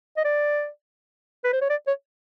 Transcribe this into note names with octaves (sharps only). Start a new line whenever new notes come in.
D#5
D5
B4
C5
C#5
D5
C#5